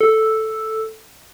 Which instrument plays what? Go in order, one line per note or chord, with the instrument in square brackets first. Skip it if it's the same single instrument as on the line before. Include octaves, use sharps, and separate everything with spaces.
[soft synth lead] A4